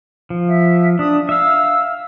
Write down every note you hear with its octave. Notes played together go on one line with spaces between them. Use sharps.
F3
E5
D4 D#6
E5 F5 E6